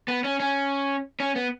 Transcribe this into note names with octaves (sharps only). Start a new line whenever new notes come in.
B3
C#4
C#4
C#4
B3